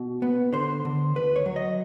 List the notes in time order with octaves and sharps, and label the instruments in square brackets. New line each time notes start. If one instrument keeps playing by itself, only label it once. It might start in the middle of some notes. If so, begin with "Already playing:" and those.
Already playing: [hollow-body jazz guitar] B2
B3
D3 C5
D3
D2 B4
C#5
F#3
D#5